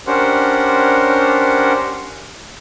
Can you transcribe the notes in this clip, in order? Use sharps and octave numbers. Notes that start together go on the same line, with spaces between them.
C#4 D4 G4 A#4 C5 F#5